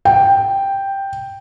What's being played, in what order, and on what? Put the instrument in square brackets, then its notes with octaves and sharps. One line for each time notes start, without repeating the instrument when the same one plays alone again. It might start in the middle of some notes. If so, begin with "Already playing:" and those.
[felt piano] G5